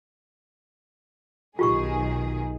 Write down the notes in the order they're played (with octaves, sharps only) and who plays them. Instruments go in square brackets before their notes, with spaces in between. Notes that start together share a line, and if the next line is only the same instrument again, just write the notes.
[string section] B1 D#3 G#4 [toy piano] F4 G4 C#6